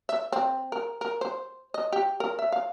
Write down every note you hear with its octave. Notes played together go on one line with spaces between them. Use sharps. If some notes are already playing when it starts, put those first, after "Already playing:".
E5
C4
A#4
A#4
C5
D#5
G4
A#4
E5
F5